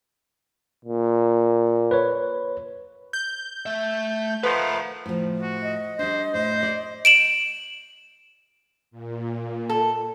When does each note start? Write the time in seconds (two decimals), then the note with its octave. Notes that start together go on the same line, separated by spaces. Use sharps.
0.85 A#2
1.91 B4 C#5
3.13 G6
3.66 A3 E5
4.43 D#3 F3 A3 B4 F5 F#5
5.06 A2 F3
5.41 F#4
5.63 D#5
5.99 G3 D4 C5
6.34 A2 C5
6.63 D5
7.05 D7 E7 F#7
8.91 A#2
9.69 A4